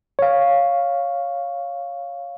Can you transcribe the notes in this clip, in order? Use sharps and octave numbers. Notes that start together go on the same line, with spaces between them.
C#5 F5